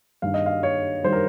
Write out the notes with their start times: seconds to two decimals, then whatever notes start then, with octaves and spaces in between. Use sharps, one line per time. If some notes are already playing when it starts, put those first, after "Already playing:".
0.22 G2 D#3 G3 F5
0.34 D#5
0.46 F5
0.63 C#5
1.04 D#3 G3 C5
1.13 A#4